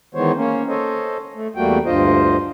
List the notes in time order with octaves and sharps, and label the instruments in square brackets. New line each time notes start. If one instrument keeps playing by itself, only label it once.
[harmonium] D#3 E3 G#3 B3 C5 C#5
A#3 C#4
A4 C5 C#5 D#5
A3
E2 G3 A3 A#3 F#4 G5
D2 G2 F4 C5 D#5